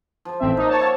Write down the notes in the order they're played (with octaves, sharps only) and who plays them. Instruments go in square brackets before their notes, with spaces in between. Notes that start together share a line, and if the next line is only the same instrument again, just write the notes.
[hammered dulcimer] F3 C5
[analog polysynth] A1 C4 E5
[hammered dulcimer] A#3 [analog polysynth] D#4
[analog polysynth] C#5 A5
[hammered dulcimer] E5 F#5